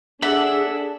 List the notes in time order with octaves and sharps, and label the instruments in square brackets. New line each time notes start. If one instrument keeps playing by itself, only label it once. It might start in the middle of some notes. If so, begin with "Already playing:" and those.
[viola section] D4 G#4 [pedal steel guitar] A4 F#5 [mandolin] E5